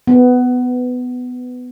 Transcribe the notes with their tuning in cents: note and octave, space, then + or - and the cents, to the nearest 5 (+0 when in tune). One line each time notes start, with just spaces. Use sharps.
B3 +15